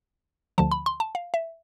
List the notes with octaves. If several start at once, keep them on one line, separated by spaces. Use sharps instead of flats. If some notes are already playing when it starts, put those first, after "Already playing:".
D2 D3 F3 A5
B5
C6
A5
F5
E5